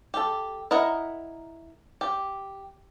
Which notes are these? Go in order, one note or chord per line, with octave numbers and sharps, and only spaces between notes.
G4 A4
E4 A#4 D#5 F#5
G4